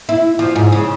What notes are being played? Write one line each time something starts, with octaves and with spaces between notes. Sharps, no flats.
E4
F3
G#2
C#3